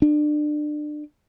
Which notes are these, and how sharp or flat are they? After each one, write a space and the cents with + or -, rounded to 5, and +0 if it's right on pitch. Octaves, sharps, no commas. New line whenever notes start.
D4 +30